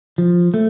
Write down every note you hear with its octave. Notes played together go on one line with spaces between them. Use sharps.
F3
A3